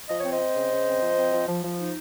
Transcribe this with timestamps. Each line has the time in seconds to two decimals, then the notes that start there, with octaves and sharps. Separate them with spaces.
0.09 F3 D#5
0.20 C4 C#5
0.33 C5 D#5
0.40 C4
0.56 C#3
0.71 C#3
0.86 C4
1.01 F3
1.16 C4
1.32 F3
1.48 F3
1.63 F3
1.79 D#4